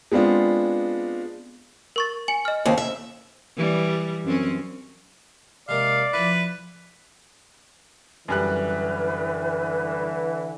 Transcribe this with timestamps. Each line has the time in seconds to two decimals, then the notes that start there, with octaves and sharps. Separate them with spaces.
0.12 G#3 B3 C4 D4 F4
1.96 A#4 C#6 A6
2.28 G#5 C#7 F#7
2.45 D#5 F6
2.65 D#2 C#3 C4
2.78 E5
3.57 E3 G3
4.25 F#2 C4 C#4
5.69 C3 G#3 A#3 D5 F5
6.13 F3 E4 B4
8.28 F#2 D3 E3 G3 B4 F#6